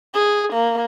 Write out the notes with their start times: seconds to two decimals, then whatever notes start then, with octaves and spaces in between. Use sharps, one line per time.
0.14 G#4
0.53 A#3